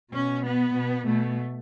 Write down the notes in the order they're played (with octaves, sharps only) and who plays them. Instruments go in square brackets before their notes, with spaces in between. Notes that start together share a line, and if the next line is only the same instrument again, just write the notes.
[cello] B2 [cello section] C#4
[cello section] B3
[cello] B2
[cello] B2 [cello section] A3